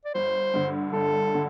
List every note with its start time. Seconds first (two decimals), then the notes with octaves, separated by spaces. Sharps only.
0.05 D5
0.15 G1 C5
0.54 G2 D3
0.92 G1 A4
1.34 D3